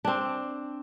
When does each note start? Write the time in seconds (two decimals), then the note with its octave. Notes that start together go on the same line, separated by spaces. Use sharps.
0.05 C4 D4